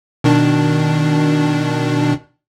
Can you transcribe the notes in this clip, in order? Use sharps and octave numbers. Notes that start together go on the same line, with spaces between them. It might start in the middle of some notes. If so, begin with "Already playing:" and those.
B2 D#3 D4